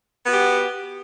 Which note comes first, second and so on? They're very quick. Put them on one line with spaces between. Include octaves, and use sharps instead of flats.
B3 F#4 G4